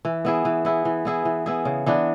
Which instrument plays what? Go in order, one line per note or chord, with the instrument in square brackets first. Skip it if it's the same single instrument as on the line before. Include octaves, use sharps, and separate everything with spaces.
[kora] E3
B3 E4 G#4
E3
B3 E4 G#4
E3
B3 E4 G#4
E3
B3 E4 G#4
C#3
E3 B3 D4